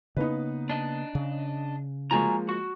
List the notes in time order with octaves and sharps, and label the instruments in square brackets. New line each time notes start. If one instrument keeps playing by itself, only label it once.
[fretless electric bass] C#3 A#3 B3 [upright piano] D#4 B4
[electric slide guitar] D4 D#5
[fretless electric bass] C#3
[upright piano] F3 G#3 A#3 [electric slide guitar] F#4 G#5 A#5
[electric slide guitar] F#4